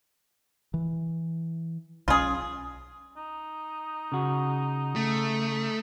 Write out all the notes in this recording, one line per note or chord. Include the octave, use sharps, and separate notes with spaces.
E3
B1 E3 C#4 F4 G#4
D#4
C#3 F#4
A3